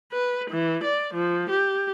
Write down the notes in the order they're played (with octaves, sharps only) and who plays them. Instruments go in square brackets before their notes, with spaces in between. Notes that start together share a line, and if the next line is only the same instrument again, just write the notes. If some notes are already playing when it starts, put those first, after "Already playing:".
[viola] B4
E3
D5
F3
G4